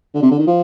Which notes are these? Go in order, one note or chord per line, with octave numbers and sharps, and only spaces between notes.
D3
C3
D3
D#3
F3